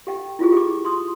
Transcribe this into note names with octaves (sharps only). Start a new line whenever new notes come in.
G4 G5
E4 F4 G4 G#4
G4 D6
C6 D#6